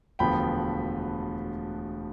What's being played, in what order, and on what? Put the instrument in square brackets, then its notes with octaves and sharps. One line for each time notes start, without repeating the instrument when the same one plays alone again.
[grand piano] E1 D2 D3 F3 B3 G5 B5